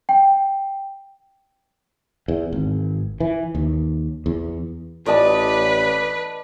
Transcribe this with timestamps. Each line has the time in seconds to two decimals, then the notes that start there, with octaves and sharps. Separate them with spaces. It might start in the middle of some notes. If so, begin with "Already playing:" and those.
0.09 G5
2.28 E2
2.53 G#1
3.20 E3
3.55 D#2
4.26 E2
5.06 A1 B4 D5 D#5 A5